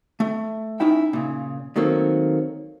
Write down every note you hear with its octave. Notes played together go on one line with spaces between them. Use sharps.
A3
C#4 D#4 E4 G5
A#2 C#3
D#3 F#3 A3 A#3 C4